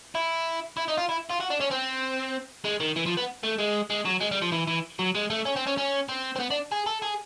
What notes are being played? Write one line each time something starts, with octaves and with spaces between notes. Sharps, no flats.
E4
E4
D#4
F4
E4
F4
F#4
D4
C#4
C4
G#3
D#3
E3
F3
B3
A3
G#3
G#3
F#3
G#3
G3
F3
E3
E3
F#3
G#3
A3
C#4
C4
C#4
C#4
C4
C4
B3
D4
G#4
A4
G#4